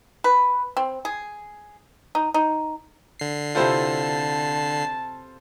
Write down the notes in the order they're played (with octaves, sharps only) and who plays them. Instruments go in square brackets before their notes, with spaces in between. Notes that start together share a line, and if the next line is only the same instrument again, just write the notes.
[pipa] B4
C4
G#4
D#4
D#4
[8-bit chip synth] D3 C7
[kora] C3 E4 G5 [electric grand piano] F4 A4 C5 [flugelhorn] A5